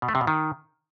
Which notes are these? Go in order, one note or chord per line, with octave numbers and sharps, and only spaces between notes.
B2
A3
C3
B2
D#3